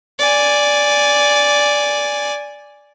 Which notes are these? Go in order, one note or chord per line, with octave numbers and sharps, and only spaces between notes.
D5 G#5